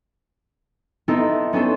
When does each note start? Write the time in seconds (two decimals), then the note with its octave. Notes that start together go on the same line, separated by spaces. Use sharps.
1.08 B3 C4 D#4 E4 A4
1.53 B3 C#4 D4 A4 C5